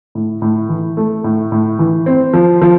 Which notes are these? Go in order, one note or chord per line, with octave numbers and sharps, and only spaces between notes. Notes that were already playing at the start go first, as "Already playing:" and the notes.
A2
A2
E3
A3
A2
A2
E3
C4
F3
F3